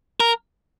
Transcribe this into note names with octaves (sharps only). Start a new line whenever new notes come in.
A#4